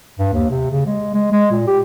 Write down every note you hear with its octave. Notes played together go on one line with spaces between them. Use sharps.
G2
D#2
C3
C#3
G#3
G#3
G#3
A#2
G4